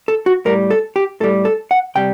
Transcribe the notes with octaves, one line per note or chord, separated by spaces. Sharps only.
A4
F#4
A2 G3 A#4
A4
G4
A2 G3 A4
A4
F#5
C3 G3 G5